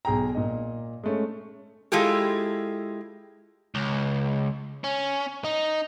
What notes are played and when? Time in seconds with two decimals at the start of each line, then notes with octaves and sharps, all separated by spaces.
0.05 B1 G#4 G5 A#5
0.35 A#2 D#5
1.04 G#3 A3 C#4
1.92 G#3 E4 F4 G4 A4
3.75 C#2
4.84 C#4
5.44 D#4